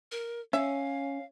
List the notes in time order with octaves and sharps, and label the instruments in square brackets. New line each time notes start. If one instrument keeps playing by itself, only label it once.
[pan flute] A#4
[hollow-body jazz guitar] C#4 [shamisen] E5 [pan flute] F5